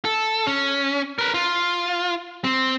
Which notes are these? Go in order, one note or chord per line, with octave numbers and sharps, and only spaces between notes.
A4
C#4
A#4 B4
F4
C4